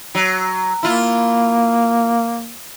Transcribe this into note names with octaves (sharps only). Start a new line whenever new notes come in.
F#3
A#3 E4 F4